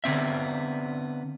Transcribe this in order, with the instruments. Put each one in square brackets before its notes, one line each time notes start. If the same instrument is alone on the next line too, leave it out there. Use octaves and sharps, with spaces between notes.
[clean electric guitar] D3 B3 C4 E5